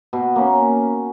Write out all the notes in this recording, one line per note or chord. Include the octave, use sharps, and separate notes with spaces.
B2
A#3 C#4